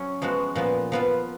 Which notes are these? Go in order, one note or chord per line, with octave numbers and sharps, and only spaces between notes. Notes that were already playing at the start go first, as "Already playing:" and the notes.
Already playing: F#3 C#4
F3 G#3 B3 F#4
A#2 F3 B3
F3 B3 F4